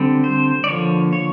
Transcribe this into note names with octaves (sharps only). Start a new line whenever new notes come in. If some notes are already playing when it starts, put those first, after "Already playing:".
Already playing: D3 G3 C4
C5
D5
D3 F3 A#3 C#5
C#5